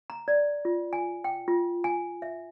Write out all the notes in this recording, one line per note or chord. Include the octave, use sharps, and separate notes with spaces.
A#5
D5
F4
G#5
G5
F4
G#5
E5